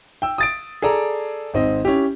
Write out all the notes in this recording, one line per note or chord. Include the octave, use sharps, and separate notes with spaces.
G5 E6
D#6 A6 D7
G#4 A4 D5 A#5
G#1 G#2 C4 D#5
C#4 E4 G4